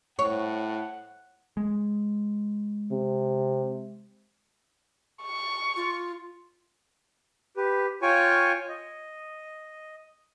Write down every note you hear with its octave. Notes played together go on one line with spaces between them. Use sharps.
A2 C#5 F#5
G#3
C3
C#6
F4
G4 B4
F4 C#5 G5 G#5 C#6
D#5